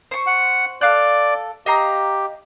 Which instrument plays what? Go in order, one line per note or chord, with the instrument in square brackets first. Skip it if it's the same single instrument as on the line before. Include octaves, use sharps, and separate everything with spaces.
[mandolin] C5 C#6
[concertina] F#5
[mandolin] A4 F5 F#6 [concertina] D5
[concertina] G4 [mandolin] D#5 F5 A#5